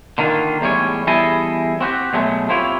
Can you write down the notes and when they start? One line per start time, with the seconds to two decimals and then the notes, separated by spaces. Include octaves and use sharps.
0.18 D3 D#3 A#3 F4
0.61 E2 A2 G3 G#3 C#5
1.07 E2 G3 E4 G#4 A4 D#5
1.81 C4 F#4 G4
2.13 B2 F#3 G#3 A3
2.49 C4 E4 F4 G4 C#5